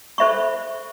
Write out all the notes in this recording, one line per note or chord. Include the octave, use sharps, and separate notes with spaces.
A4 C5 E5 B5 C#6